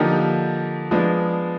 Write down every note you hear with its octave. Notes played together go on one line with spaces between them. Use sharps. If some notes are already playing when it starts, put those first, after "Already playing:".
Already playing: D3 F3 A#3 D#4 G4
F3 G#3 B3 D4